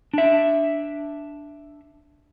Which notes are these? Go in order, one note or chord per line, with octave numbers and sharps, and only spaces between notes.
D4 E5